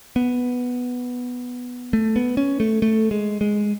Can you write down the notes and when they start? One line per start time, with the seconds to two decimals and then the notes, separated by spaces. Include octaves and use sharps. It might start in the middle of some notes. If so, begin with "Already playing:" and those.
0.16 B3
1.93 A3
2.16 B3
2.37 C#4
2.60 A3
2.82 A3
3.11 G#3
3.41 G#3